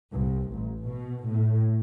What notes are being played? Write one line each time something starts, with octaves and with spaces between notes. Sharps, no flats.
C2
A1
B2
A2